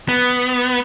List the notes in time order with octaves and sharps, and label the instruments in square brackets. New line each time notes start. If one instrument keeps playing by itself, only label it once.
[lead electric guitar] B3